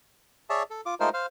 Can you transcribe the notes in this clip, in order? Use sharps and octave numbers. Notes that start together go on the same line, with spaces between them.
G#4 C#5 D5 E5 A5
A4
F4 D6
G#3 A3 D#4 F4 A#4 C5
C5 F5